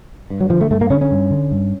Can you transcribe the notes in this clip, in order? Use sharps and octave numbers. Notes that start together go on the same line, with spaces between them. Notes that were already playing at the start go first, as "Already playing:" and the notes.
G2
F#3
D3 F3
A3
G2 A3
A#3
D3 C#4
C#4
G2
D3
G2